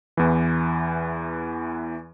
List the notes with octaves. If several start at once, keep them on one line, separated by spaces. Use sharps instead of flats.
E2 E3